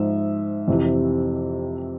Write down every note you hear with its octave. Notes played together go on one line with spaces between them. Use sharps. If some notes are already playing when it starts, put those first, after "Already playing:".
Already playing: G#2 F3 E5
F2 C3 E3